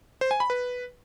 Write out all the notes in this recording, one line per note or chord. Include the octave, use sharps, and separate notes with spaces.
C5
G#5
B5
B4